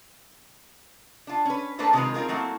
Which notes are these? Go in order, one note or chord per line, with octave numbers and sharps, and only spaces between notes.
D4 F4
C#4 B4
A3 A#3 D4 A4 B4 C5
C3 D#3 G#3 A3 F4 B4
C4 D#4 F4 G#4 A#4
F#3 A3 A#3 C4 E4